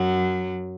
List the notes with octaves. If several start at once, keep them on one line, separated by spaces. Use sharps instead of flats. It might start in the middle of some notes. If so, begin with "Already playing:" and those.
Already playing: F#2 F#3